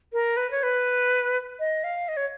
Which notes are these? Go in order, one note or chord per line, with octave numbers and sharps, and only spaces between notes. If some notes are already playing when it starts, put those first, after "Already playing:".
A#4
B4
C#5
B4
D#5
F5
D#5
C#5